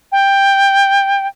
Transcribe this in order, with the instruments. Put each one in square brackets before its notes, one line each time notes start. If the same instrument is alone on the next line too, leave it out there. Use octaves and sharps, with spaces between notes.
[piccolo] G5